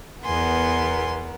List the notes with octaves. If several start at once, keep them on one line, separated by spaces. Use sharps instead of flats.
E2 B3 A#4 G#5 C6